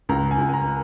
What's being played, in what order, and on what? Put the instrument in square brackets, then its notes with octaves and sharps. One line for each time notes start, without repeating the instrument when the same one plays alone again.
[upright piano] C#2 A#5
G#5
C#2
G#5
A#5